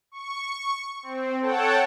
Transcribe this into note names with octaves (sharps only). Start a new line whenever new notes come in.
C#6
C4
A4 C#5 F#5 G5 A5